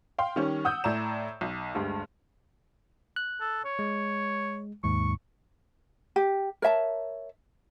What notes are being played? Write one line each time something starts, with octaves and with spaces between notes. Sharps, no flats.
F5 G5 C6
D#3 G3 C#4
F#5 D#6 E6 G6
A2 D5 A#5 E7
B1
D2 G2 G#3
F#6
A4
C#5
G#3
D#2 G#2 C#6
G4
A#4 C#5 E5 A5